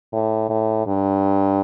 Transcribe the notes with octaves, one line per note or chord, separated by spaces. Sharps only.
A2
A2
G2